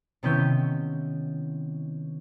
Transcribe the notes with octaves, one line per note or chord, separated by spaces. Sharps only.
C3 D#3 B3 C#4 E4 G6